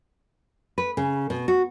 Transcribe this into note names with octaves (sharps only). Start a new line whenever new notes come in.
B4
C#3
B2
F#4